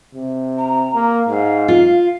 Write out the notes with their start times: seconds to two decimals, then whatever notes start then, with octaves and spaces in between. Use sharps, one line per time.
0.14 C3
0.57 A#5
0.94 A#3
1.28 G#2 F5
1.68 F4